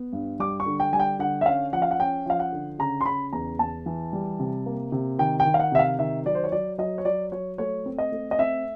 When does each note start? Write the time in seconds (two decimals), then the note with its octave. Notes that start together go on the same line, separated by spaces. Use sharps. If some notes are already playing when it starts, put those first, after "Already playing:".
Already playing: B3
0.13 G2
0.39 G3 D6
0.60 C#6
0.66 D3
0.80 G5
0.93 G3 G#5
1.00 G5
1.19 D3 F#5
1.41 E5
1.46 C#4 F5
1.73 F3 F#5
1.82 F5
1.91 F#5
1.99 C#4 G5
2.26 F3 F5
2.39 F#5
2.52 D3
2.79 C#3 A#5
3.01 C6
3.06 C#3 B5
3.33 E2 A#5
3.59 E2 A5
3.86 E3
4.13 G3
4.40 C3
4.66 A#3
4.92 C3
5.19 D#3 G5
5.40 G5
5.46 D#3
5.54 F5
5.60 F#5
5.72 C3 E5
5.79 F5
5.99 D#3 E5
6.26 F#3 D5
6.35 C5
6.44 C#5
6.52 F#3 D5
6.78 F#3 D#5
6.98 C#5
7.05 F#3 D5
7.32 F#3 C#5
7.58 A3 C#5
7.86 C4
7.98 D#5
8.12 A3
8.31 D#5
8.39 C4 E5